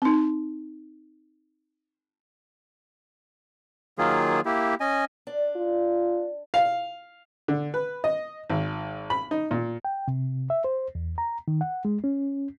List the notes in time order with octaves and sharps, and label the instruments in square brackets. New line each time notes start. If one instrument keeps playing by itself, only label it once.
[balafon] C4 D#4
[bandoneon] D#3 F#3 A#3 F4 G#4
A#3 E4 G4
C#4 D#5 G#5
[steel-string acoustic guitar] D4
[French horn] F4
[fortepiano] F5
D3
B4
D#5
G#1
B5
D#4
A#2
[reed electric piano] G5
C3
E5
C5
E2
A#5
D#3
F#5
G#3
C#4